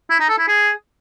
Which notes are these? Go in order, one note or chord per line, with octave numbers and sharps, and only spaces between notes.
E4
D#4
A4
E4
G#4